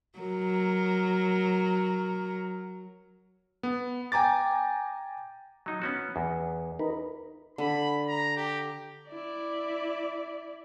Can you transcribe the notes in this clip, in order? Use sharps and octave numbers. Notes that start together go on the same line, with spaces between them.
F#3 A#4
B3
G5 G#5 A#5 D6 A6
F#3 D#4
B3 C#4 F#4
E2
D#4 A#4 B4
D3 B5
A#5
G4
E4 D5